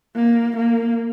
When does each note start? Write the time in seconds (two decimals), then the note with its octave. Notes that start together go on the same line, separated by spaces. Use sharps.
0.16 A#3
0.57 A#3